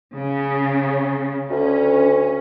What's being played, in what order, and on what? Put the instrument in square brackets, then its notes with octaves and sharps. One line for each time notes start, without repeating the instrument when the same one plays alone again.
[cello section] C#3
[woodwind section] D2 [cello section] C#4